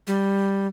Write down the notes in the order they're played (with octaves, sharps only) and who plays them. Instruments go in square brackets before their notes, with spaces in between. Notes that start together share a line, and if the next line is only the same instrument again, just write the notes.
[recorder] G3